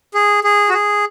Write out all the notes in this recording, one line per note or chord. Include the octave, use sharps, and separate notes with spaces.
G#4
G#4
F#4
G#4